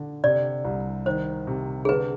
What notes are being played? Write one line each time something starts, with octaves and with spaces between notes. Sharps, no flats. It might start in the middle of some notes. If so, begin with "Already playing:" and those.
Already playing: D3
C3 D5
C2
D#3 C5
C3
G#4
D3 B4